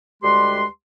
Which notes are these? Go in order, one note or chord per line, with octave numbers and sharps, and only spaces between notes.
D2 G3 G#3 G4 B4 C6